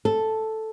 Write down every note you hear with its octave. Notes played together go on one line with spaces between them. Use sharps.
A4